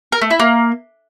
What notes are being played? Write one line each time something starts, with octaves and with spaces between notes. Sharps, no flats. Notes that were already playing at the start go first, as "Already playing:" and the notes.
A#4
A3
E4
A#3